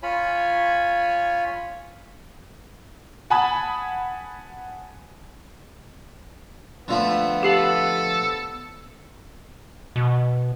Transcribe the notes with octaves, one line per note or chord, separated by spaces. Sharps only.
F4 C#5 G#5 B5
F#5 G#5 A5 B5 D#6
D3 F3 A3 B3
G4 A4 F5 F#7
B2